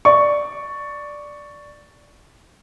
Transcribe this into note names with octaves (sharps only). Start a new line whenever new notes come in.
D5 C#6